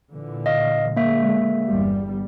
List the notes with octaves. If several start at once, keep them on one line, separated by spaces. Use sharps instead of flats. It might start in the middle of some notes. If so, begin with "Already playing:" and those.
A#2 D3 E3
D#5 F5
D3 G#3 A#3 E5
G1 E2 G3